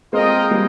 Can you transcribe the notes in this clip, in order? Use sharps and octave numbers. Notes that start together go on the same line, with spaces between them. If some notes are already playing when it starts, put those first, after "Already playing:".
G#3 C4 F4 A#4 D#5 G5
G3 A#3